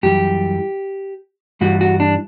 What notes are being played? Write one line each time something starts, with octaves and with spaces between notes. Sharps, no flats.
F#2 E3 G3 G4
G2 E3 G3 F#4
F#4
D4